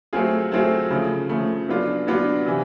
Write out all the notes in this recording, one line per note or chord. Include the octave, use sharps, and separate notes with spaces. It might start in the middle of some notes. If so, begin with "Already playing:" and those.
F#3 A3 C4 F4 G#4
F#3 A3 C4 F4 G#4
C#3 F3 A3
C#3 F3 A3
F#3 B3 D4 F4
F#3 B3 D4 F4
C3 E3